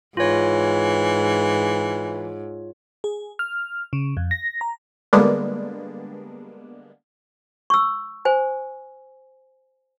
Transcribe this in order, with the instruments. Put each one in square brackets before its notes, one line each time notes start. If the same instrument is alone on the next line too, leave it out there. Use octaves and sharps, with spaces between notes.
[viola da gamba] G#2 [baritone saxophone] E3 [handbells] F4 C#5
[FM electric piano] G#4
F6
C#3
F2
A#6
A#5
[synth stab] D3 G3 G#3 A#3 B3 D4
[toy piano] C#6 E6
C5 G#5